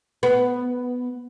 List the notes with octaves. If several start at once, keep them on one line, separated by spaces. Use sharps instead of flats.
B3